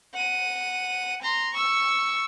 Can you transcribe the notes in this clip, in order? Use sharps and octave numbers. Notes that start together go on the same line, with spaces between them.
F#5 D#7
A#5 C6
C#6 E6